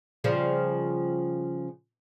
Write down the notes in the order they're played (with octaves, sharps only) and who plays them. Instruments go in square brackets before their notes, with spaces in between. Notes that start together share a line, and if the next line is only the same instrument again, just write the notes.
[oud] C#3 F3 G3